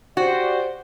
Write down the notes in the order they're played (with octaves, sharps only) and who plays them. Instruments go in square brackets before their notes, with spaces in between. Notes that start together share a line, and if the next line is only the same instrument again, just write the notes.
[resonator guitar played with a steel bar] F#4 [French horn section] G4 C5 D5